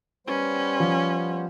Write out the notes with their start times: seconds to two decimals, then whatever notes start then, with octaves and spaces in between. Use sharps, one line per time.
0.27 G3 B3 C#4 C5
0.80 F3